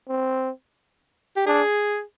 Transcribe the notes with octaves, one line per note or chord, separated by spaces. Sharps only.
C4
G4
D4 G#4